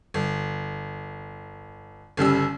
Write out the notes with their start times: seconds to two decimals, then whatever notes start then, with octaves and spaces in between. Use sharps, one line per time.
0.14 G1
2.17 G1 C#3 G3 E6